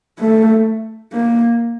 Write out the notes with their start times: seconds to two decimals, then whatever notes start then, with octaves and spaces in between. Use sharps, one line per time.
0.19 A3
1.12 A#3